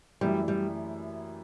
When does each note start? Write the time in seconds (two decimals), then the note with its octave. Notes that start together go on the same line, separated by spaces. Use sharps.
0.21 F#2 E3 G3 A3 E4 G4
0.48 G3